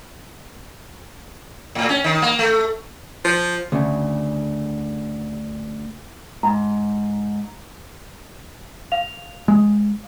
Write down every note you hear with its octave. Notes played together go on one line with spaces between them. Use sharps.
A2
C#4
D#3
A#3
A3
F3
D2 C#3
G#2 A#5
F5 F7
G#3